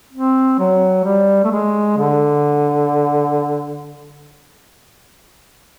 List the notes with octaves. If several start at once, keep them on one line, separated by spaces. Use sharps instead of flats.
C4
F#3
G3
A3
G#3
D3